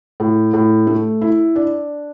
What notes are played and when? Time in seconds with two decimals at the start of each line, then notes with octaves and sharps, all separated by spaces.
0.20 A2
0.53 A2
0.87 A3
1.21 E4
1.56 D4